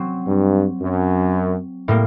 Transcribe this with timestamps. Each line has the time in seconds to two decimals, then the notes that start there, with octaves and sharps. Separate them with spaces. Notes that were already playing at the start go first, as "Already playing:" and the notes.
Already playing: F#3 C4
0.27 G2
0.80 F#2
1.88 A2 G3 A#3